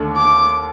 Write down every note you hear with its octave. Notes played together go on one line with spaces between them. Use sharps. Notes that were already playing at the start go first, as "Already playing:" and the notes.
Already playing: D#2 D3 A3 D4
D6